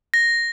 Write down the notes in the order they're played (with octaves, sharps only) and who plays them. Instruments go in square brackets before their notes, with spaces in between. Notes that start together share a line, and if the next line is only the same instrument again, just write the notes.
[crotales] A#6